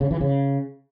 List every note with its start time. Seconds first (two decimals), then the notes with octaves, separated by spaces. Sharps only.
0.01 C#3
0.11 E3
0.21 C#3